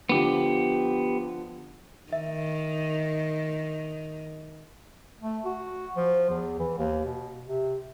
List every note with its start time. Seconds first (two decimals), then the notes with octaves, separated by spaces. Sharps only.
0.09 D3 F3 B3 G4
2.13 D#3 E5
5.20 A3
5.45 F#4
5.96 F3
6.30 E2
6.59 E3
6.78 D#2
7.05 B2
7.43 C3